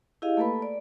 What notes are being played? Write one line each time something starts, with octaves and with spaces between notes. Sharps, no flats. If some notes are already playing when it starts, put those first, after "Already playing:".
E4 G4 G#4 D#5 F5
A3 A#3 A4 B4 B5
D5